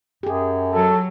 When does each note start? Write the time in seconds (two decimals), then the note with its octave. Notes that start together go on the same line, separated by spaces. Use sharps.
0.23 F#2 G4 G#4
0.73 F#3 A4